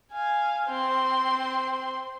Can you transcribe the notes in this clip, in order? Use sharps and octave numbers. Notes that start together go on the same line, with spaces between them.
F5 G#5
C4 C6